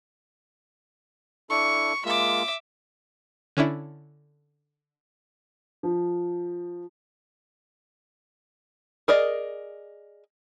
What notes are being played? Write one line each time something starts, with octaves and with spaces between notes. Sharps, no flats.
D4 E4 A4 C#6
G#3 A#3 F4 E5 D6
D3 C#4 D4 E4
F3
G#4 A#4 D5 D#5